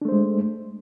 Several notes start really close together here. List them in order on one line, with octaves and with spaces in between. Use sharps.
D4 A3 C5 G#3